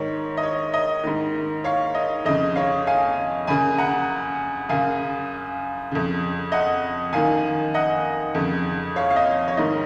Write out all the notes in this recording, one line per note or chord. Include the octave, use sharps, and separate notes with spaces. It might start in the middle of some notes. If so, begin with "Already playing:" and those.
Already playing: G#2 D#3 C#5
D#5
C#5
D#5
G#2 D#3
C#5 F5
D#5
F2 C#3 D#5
C#5 F5
F5 G#5
F#2 C#3 G#5 B5
F#5 A#5
F#2 C#3 F5 G#5
F2 C#3
D#5 F#5
F#2 D#3 F5 G#5
D#5 F#5
F2 C#3
C#5 F5
F5
D#5
C#5
G#2 D#3 D#5